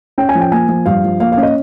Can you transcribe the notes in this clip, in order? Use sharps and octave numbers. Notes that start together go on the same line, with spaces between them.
C#4 G5
G#5
F3
G5
A#3 G#5
F3
G2 F5
F3
A#3 F5
F5
C#4
D#5